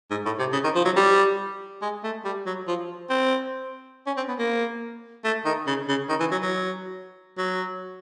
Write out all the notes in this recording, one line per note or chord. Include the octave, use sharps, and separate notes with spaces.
G#2
A2
C3
C#3
D#3
F3
F#3
G3
G#3
A3
G3
F#3
F3
C4
C#4
C4
B3
A#3
A3
D#3
C#3
C#3
D#3
E3
F#3
F#3
F#3